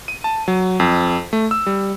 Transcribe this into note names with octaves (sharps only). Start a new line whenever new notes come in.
D#7
A5
F#3
F2
A3
E6
G3